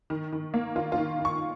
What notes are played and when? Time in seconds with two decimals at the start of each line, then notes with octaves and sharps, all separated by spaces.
0.10 D#3
0.33 D#3
0.54 A#3
0.75 D#3 F4
0.92 F4
0.98 D#3
1.19 D#3
1.25 C#6